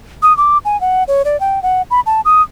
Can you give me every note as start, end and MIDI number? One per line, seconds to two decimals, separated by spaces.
0.22 0.36 87
0.37 0.58 86
0.65 0.80 80
0.81 1.03 78
1.08 1.22 73
1.25 1.39 74
1.40 1.62 79
1.63 1.82 78
1.91 2.00 83
2.06 2.21 81
2.25 2.42 87